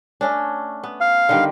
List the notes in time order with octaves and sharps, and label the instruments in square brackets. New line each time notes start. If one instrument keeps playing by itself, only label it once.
[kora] A3 C#4 D4
B3
[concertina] F5
[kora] D3 D#3 G3